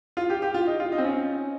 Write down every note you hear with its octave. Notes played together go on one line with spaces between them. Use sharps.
F4
G4
G4
F4
D#4
F4
D#4
C4
C#4